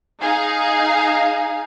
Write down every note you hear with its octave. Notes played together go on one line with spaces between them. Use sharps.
D#4 G#4 F5